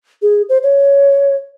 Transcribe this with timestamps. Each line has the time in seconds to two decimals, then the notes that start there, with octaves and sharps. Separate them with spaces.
0.22 G#4
0.49 C5
0.63 C#5